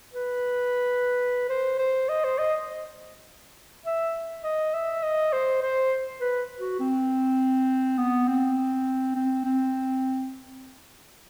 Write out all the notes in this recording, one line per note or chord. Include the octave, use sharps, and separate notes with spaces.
B4
C5
C5
D#5
C5
D#5
E5
D#5
E5
D#5
C5
C5
B4
F#4
C4
B3
C4
C4
C4